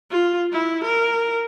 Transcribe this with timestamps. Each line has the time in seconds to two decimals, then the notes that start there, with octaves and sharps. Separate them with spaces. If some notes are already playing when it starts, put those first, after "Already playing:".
0.10 F4
0.53 E4
0.85 A#4